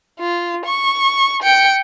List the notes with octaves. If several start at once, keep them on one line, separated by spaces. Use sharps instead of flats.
F4
C#6
G5 C#7